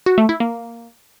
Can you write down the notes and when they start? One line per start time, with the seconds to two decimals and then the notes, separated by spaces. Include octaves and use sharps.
0.06 F#4
0.18 A3
0.29 E4
0.40 A#3